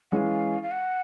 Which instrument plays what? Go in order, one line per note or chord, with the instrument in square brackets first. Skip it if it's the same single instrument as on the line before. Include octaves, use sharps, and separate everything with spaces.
[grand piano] E3 G#3 C#4 [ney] F5 F#5
[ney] F5
F#5